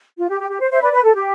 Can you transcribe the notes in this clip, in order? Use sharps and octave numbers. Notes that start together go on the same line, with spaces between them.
F4
G4
G4
G4
C5
C5 E5
B4 D5
B4
A4
G4